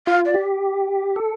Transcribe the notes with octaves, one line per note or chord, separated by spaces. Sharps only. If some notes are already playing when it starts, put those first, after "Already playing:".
F4 F5
D5
G4
A4